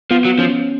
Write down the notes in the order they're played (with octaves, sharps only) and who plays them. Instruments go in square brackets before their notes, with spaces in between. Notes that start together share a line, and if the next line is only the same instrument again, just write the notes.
[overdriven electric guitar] F3 [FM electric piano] B3
[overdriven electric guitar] F#3
[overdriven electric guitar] F3 [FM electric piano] C#4